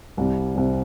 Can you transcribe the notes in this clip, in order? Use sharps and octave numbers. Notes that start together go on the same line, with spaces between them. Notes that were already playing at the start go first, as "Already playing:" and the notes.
C2 C3 G3
C2 C3 G3